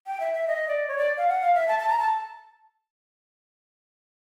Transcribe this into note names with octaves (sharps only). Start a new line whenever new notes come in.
G5
E5
E5
D#5
D5
C#5
D5
F5
F#5
F5
E5
A5
A5
A#5
A5